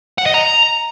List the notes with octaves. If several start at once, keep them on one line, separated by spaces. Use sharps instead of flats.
F#5
D#5
A#5